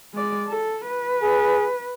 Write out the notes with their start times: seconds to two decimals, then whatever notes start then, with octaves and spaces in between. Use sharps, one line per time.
0.14 G#3 D5
0.48 A4
0.88 B4
1.22 G#4